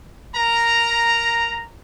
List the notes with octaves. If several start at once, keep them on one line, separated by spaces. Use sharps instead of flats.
A#4 A#5